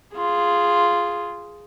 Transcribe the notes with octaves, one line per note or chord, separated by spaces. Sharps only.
F4 G#4